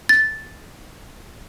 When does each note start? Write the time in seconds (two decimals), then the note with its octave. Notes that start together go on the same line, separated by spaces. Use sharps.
0.09 A6